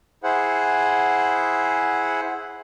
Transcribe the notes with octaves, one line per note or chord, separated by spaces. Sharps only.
E4 G#4 C5 F#5